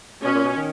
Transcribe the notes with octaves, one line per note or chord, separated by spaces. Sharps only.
B2 C#4
A#2
B2
D#3